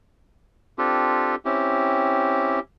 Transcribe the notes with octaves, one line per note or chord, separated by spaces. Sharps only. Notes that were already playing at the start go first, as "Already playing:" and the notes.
C4 D4 F4 G4 A4
C4 C#4 E4 G4